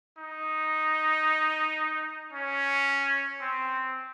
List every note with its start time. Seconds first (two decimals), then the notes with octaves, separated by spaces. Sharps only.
0.18 D#4
2.33 C#4
3.41 C4